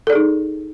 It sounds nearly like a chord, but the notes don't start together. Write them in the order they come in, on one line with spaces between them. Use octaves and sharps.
A4 D5 G#4 D#4